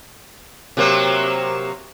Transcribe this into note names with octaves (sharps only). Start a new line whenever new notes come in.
C3 F#3 A#3